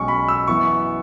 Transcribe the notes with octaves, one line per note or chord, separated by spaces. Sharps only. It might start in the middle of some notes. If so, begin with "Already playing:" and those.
Already playing: B1 B2 G#3 C#4 C#6
B5
E6
F#2 E3 B3 C#6